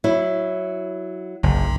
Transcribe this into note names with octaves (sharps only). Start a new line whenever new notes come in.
F#3 E4
F#1 B1